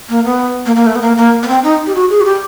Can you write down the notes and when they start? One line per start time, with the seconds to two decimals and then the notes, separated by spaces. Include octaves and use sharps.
0.09 A#3
0.25 B3
0.66 A#3
0.76 A#3
0.87 A3
0.95 B3
1.02 A#3
1.17 A#3
1.43 B3
1.48 C4
1.64 D#4
1.87 G4
1.95 F#4
2.10 G#4
2.21 F#4
2.25 G4